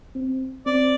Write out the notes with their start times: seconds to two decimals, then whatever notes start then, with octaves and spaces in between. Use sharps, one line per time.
0.15 C4
0.66 C4 D5